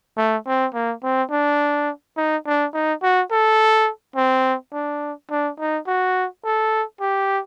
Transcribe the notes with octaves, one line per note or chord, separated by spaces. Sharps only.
A3
C4
A#3
C4
D4
D#4
D4
D#4
F#4
A4
C4
D4
D4
D#4
F#4
A4
G4